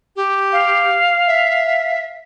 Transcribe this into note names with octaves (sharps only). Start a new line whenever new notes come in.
G4
F5
E5